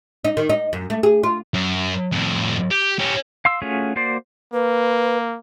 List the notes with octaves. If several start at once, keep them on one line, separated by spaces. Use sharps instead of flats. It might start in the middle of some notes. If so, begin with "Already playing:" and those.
D#4
D#3
D#4
F#2
A3
G#4
F4
F#2
F2 A2
G4
C#4 G4
F5 C6 E6
A3 C#4 F4 F#4 G#4
A#3 F#4 C5 D5 C6
A#3 B4